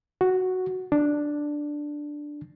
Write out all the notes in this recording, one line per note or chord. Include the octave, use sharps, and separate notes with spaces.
F#4
D4